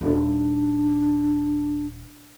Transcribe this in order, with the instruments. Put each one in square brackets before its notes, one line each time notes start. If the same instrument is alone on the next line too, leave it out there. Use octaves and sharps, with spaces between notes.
[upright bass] D#1 D#4 [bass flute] D4